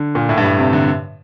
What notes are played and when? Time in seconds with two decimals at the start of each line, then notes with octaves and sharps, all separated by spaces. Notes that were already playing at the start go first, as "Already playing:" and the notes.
Already playing: D3
0.15 A#2
0.29 A2
0.37 G2
0.45 A2
0.58 C3
0.73 D3